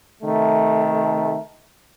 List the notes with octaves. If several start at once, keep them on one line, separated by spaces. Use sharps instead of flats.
C3 D#3 A3